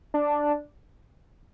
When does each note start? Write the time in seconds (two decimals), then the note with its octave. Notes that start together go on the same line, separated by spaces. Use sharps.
0.14 D4